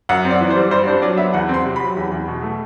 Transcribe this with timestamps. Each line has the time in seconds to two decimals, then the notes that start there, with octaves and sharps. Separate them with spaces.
0.09 F#2 F#5
0.25 C4
0.30 D5
0.41 E3
0.50 C5
0.55 G3
0.71 G2 C5
0.87 D4 C5
1.02 F#3 D5
1.18 B3 E5
1.33 E2 F#5
1.49 C4
1.54 C6
1.65 C3
1.76 F#3 B5
1.97 E2
2.11 E2
2.28 B2
2.43 A3